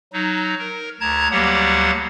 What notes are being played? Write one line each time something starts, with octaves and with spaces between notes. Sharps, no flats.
F#3 D#4
A#4
D2 A5 A#5 G#6
D2 F#3 G3 A#3 G4 F#5